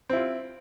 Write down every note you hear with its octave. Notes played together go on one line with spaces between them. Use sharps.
C4 E4 F4